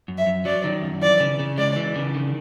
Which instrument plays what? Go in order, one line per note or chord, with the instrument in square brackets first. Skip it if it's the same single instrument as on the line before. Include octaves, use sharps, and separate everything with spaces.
[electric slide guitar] F#2
[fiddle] E5
[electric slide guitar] F#2
[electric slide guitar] F#3 [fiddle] D5
[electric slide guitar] D#3
F#2
[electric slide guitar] E3 [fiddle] D5
[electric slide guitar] C#3
C#3
[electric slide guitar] G#3 [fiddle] D5
[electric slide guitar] E3
C#3
D#3